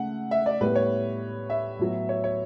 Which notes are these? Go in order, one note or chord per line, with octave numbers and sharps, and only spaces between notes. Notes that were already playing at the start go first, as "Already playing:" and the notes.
Already playing: C#3 A3 F#5
E5
D5
A2 G3 B3 B4
C#5
E5
A2 F#3 B3
C#5
C#5